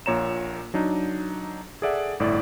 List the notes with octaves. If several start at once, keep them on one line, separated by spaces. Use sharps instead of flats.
A#1 A#2 C#5 A#5 E7
F#3 D4 D#4
G#4 A4 D5 E5 F#5
G1 A2 E4 D5